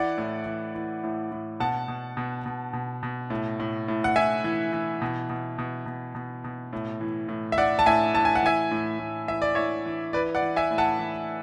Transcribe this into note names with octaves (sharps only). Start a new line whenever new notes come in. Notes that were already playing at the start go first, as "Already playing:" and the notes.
Already playing: E3 D5 F#5
A2
E3
E3
A2
A2
B2 F#5 A5
B2
B2
B2
B2
B2
A2
A2
A2
F#5
A2 E5 G#5
E3
E3
B2
B2
B2
B2
B2
B2
A2
E3
A2
E5
A2 D5 F#5
A5
A2 E5 G#5
A2 A5
G#5
F#5
E3 E5 G#5
A2
A2
E3 E5
D5
E3 C#5 E5
E3
E3 B4 D5
D5 F#5
E3
E5 G#5
A2
F#5 A5
E3